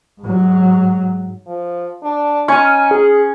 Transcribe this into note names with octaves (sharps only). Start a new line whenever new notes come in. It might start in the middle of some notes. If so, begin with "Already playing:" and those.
G#2 F#3
F3
D4
C#4 D#4 C#5 G#5 C#6
G#4